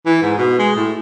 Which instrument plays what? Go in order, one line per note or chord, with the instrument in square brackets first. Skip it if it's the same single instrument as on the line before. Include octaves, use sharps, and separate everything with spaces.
[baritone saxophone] E3
G#2
B2
G#3
A2